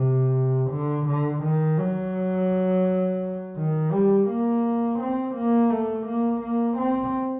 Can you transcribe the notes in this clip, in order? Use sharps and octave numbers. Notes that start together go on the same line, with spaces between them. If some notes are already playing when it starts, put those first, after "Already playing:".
Already playing: C3
D3
D3
D#3
F#3
D#3
G3
A#3
C4
A#3
A3
A#3
A#3
C4